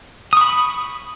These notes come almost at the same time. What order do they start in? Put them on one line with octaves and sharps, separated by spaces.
D#6 C#6 B5